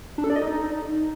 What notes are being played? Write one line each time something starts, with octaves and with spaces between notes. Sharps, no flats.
D4
A4
D5
D#5
D#4